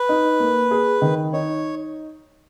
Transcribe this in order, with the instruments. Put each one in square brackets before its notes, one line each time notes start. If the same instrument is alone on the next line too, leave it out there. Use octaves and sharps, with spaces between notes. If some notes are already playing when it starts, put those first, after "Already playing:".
Already playing: [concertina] B4
[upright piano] D#4
A#3
G#4
D#3
[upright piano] D#4 [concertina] C#5